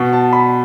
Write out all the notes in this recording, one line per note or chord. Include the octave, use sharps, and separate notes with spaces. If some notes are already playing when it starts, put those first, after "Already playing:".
Already playing: B2
A5
B5